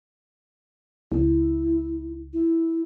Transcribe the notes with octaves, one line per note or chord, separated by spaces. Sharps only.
C#2 E4
E4